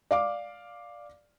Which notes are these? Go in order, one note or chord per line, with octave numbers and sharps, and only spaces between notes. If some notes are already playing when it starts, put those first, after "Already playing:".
D5 F5 D6